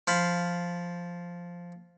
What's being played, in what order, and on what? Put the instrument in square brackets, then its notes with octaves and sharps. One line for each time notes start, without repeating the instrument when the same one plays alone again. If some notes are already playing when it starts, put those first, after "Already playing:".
[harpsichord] F3 F5 B5